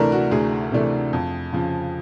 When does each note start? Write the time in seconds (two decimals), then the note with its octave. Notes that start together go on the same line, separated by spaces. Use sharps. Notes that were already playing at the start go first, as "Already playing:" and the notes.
Already playing: D2 C3 E3 A3 D4 A#4
0.12 F#4
0.31 D2 G#4
0.72 C3 E3 A3 D4
1.13 F2
1.53 C#3 F3